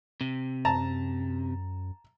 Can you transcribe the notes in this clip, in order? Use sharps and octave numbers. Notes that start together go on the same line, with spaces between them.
C3
F#2 A5 A#5